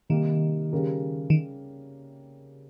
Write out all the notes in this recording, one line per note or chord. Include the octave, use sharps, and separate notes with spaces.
C3 D#3 G3 A#3 D#4 G4
C#3 G3 C#4 G4 A#4
D#3